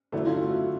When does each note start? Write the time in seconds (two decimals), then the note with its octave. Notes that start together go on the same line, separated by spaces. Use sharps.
0.12 D3 F#3 A3 E4
0.27 F4
0.42 F#4